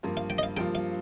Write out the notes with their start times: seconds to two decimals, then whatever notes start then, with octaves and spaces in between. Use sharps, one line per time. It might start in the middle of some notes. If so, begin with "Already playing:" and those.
0.03 G2 F3 A#3 F4
0.17 F5
0.30 G5
0.38 D#5
0.43 F5
0.57 G2 F3 A#3 F4 G5
0.75 F5